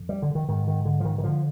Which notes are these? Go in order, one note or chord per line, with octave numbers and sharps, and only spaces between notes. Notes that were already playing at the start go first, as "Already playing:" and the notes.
Already playing: F2
G3
D3
D#3
G#2 D#3
D#3
D3
F3
D#3
D#3
D3 F3